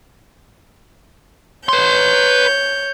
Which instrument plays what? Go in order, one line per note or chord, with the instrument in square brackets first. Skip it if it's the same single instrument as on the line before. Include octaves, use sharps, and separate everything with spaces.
[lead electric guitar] B4 C6 [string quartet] C#5 G6